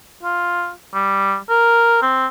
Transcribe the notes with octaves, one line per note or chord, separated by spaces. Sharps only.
F4
G3
A#4
C4